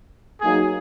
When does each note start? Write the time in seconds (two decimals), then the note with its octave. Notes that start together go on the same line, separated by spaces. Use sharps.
0.41 F#3 A#3 D#4 G#4